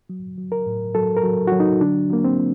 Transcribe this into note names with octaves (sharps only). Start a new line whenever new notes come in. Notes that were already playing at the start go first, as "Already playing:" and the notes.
F#3
F#3
A#4
A2
F#3 A4
A#4
F#3
F#3 F#4
D#4
D3 D4
F#3 A#3
C4